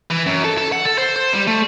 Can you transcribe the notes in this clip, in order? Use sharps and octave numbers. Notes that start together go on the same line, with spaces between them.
E3
F#2
A4
A4
F#5
A4
C5
C5
G3
A3